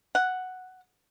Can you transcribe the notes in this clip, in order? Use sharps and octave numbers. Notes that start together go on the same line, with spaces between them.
F#5